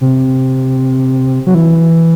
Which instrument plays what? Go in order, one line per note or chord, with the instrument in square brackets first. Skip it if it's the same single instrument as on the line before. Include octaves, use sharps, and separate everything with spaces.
[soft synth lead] C3
F#3
E3